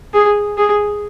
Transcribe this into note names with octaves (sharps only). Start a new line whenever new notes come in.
G#4
G#4